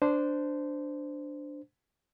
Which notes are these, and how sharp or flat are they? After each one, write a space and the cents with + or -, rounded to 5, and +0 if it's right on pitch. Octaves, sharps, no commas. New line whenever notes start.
D4 +0 C5 -15